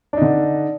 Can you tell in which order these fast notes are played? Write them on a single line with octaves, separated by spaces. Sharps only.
D4 D#4 D3